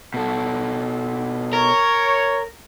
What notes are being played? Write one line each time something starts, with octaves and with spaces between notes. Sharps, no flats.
B2 A4
A#4 C#5